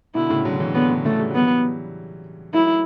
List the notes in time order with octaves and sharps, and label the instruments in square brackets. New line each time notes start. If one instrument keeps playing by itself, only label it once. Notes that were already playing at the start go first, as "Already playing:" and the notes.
[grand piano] B2 D3 [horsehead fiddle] E4
[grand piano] A2 C#3
D3 F#3
C#3 E3
[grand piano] D3 F#3 [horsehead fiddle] B3
[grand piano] A2 C#3
[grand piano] C#3 E3 [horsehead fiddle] A3
[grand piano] G3
[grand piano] F#3 [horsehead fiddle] B3
[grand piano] E3 G3
[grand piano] F#3 A3 [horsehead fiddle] E4